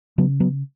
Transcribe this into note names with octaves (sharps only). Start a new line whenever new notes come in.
C#3 F#3 B3
F#3 B3